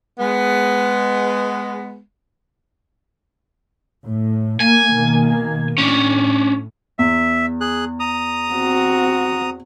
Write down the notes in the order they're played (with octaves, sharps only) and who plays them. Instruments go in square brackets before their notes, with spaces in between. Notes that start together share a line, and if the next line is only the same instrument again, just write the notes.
[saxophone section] G#3 B3
[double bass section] A2
[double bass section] A#3 [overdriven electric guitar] G#5
[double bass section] B2 D#3 A#3
[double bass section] A2 [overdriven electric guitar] C#4 D4
[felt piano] E2 [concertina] E5
[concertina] G#4 F#6
A#5 D#6
[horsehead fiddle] C4 F#4